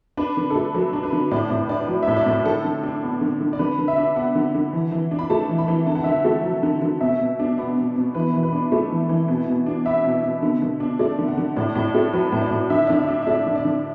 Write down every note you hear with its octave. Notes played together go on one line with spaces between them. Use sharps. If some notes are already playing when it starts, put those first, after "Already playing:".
D4 B4
D3
A4
A3 B4
F#3 A4
D4
B4
D3
A2 D5
A2
B4
D4 D5
B4
F#3 D5
A2 E5
D5
A2
D5
B4
D3 A4
D3
D4
B3
D3
D3
D5
D3 B4
D3
E5
D4
B3 F#5
D3
D3
E3
E3
D4
B5
A3 A5
E3
B5
E3
D3 A5
F#5
D3 E5
F#5
A3
F#3
D3
D3
B2 E5
B2
D4
B3
B2
B2
E3 B4
E3
B4
D4
A3
E3
E3
B2
B2
D4
B3 E5
B2
B2
D3
D3
D4
A3 D5
D3
F#5
D3
A2 D5
A2
D5
A3
F#3 B4
A2
D5
A2
D3 E5
D3 D5
E5
D4
E5
A3 D5
D3
D5
D3